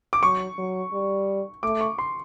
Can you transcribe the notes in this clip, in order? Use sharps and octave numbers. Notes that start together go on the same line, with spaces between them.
D6
F#3 C#6
F#3
G3
A3 D6
C#6
C6